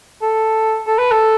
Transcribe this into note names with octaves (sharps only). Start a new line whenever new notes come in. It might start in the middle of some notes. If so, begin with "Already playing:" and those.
A4
A4
B4
A4